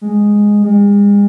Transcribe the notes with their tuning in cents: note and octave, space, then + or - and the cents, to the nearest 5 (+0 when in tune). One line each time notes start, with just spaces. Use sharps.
G#3 -5
G#3 -40